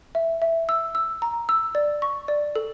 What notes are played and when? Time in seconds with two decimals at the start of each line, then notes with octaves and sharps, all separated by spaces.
0.15 E5
0.42 E5
0.69 E6
0.95 E6
1.22 A#5
1.49 E6
1.75 D5
2.02 C#6
2.28 D5
2.56 A4